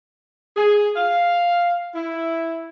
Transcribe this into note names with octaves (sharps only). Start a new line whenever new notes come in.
G#4
F5
E4